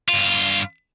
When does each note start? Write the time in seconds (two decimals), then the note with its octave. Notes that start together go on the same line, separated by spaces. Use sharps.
0.08 G2 F4